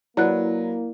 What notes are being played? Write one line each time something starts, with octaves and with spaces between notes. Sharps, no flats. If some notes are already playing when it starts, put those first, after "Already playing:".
F#3 A#3 E4 B4 D5 F#5 F#6